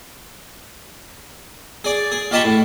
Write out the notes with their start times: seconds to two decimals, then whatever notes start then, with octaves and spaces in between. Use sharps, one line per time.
1.84 G#4 D5
2.12 G#4
2.31 F4 G4 D#5 A5 B5 C#6
2.45 A2